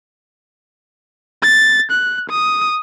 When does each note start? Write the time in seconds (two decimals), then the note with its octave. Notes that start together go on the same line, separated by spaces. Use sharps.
1.42 A6
1.91 F#6
2.30 D#6